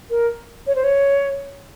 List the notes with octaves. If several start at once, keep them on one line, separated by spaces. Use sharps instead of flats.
A#4
C#5
C5
C#5